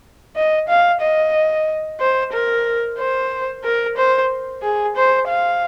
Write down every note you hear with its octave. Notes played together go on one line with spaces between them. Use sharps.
D#5
F5
D#5
C5
A#4
C5
A#4
C5
G#4
C5
F5